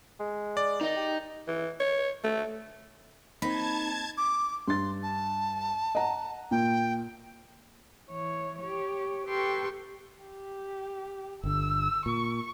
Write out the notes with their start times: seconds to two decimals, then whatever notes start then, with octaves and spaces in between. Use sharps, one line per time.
0.20 G#3
0.57 D5
0.81 D#3 D#4 D#5
0.97 G4
1.48 E3
1.80 C#5
2.24 A3
3.42 A#3 C4 D#4 A5 B5 G#6
4.18 D6
4.68 G2 C6 A6
5.03 A5
5.95 D#5 F#5 A#5
6.51 A#2 A#3 G5
8.10 E3 C#5
8.60 G4 C#5
9.26 G4 A4 B4 G5 C6 C#6
10.25 G4
11.44 G1 D3 E6
12.06 A#2 C#6